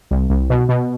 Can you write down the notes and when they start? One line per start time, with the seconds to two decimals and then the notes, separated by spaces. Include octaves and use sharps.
0.11 C2
0.30 C2
0.50 B2
0.69 B2